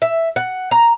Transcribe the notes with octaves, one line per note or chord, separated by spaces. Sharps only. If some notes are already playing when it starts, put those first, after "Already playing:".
E5
F#5
A#5